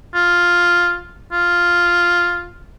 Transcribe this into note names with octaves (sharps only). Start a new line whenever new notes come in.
F4
F4